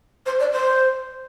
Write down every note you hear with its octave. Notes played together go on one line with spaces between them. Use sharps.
C5
D5
C5